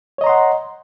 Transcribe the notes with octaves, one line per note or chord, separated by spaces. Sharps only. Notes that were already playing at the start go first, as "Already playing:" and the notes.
C#5 D#5 F#5 A#5 C6